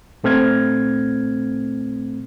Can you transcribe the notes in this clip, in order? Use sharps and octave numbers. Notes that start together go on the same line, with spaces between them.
A#2 A3 C4 F6 G#6